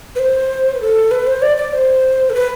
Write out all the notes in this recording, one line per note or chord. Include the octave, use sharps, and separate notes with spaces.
B4
C5
B4
A4
B4
C5
D5
D5
C5
A4
B4